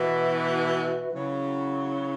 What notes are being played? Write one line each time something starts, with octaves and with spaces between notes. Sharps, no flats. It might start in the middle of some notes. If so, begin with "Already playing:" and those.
Already playing: B2 E3 F#4 B4 E5
C#3 F#3 E4 C#5 C#6